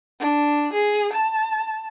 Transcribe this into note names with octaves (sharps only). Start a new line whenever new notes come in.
D4
G#4
A5